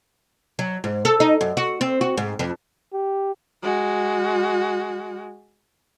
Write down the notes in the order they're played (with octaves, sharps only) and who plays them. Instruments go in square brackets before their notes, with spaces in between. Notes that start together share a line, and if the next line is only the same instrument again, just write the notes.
[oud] F#3
G#2
A4
D#4
F#2
F#4
C4
F#4
G#2
F2
[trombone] G4
[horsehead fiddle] G#3 F#4